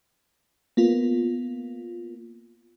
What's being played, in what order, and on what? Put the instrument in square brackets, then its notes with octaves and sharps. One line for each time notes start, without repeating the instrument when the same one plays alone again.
[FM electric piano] A#3 B3 F4